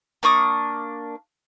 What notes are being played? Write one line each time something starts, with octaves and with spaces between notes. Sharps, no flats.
A#3 D4 C#6 D#6